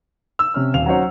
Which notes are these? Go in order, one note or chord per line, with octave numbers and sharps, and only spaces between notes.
E6
C3 C#4 F6
D#1 F5 F7
F#3 C#4 D#4 F#4 C5 C#5